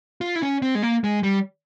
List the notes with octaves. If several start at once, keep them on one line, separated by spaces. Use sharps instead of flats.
F4
E4
C#4
C4
G#3
A#3
G#3
G3